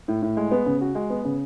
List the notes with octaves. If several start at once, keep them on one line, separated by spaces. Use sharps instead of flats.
A2
A2
G#3
B3
C#3
F#4
G#3
B3
C#3